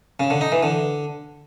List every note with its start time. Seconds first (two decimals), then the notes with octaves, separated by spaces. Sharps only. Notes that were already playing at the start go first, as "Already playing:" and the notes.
0.20 C#3
0.30 D3
0.41 D#4
0.52 E3
0.63 D3